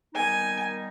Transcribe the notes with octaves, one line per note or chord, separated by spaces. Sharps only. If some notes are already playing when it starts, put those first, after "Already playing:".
D#3 G3 B3 D#4 G#5